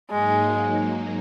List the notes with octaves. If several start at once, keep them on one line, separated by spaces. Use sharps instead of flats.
G#2 F#3 G#3 A#3 D#4